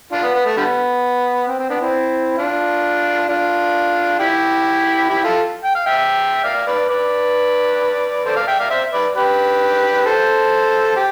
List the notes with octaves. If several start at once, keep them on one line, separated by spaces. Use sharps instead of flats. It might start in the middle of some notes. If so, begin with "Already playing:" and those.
D4 F4
B3
B3
A3
D3 G3 B3
C4
C4
B3 D4
C4 E4
D4 F4
D4 F4
E4 G4
E4 G4
F4 A4
G5
F5
E5 G5
D5 F5
B4 D5
B4 D5
A4 C5
D5 F5
E5 G5
D5 F5
C5 E5
B4 D5
G4 B4
A4 C5
G4